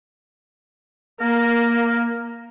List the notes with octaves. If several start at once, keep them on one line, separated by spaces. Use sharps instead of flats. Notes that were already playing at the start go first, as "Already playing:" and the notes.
A#3 A#4